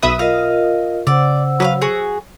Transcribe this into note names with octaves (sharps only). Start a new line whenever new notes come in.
B1 B4 E5 D#6
F4 A#4 D#5 F5
C#3 C5 D5 F#5 E6
F#3 B4 D#5 F5
F#4 G#4